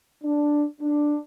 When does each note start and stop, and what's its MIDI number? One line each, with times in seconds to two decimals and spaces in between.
0.23 0.64 62
0.81 1.16 62